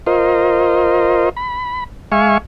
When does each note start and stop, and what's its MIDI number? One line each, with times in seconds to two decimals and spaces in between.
0.07 1.29 65
0.07 1.29 70
0.07 1.29 72
0.07 1.29 75
1.37 1.84 83
2.12 2.38 56
2.12 2.38 76
2.12 2.38 77
2.12 2.38 80
2.12 2.38 85